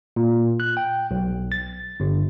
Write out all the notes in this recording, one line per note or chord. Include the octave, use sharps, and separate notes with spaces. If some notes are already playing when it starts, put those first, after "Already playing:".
A#2
F#6
G5
B1
A6
G1